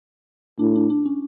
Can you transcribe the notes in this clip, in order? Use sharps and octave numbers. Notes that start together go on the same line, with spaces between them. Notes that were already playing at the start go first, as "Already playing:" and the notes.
A2 D4
D4
D4
C#4